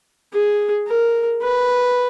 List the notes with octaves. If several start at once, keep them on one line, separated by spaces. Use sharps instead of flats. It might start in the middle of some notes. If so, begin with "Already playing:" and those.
G#4
A#4
B4